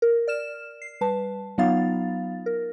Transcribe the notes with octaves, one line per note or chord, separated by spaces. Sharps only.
A#4
D5 F6 E7
C7
G3 B4 A5
F#3 B3 D#4 F4 F5 A6
A#4